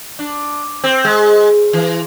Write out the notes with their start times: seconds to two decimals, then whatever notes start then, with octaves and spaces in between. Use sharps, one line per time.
0.19 D4
0.84 C4
1.05 G#3
1.73 E3